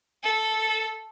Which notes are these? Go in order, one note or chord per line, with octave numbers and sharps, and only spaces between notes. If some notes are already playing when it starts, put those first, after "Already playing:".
A4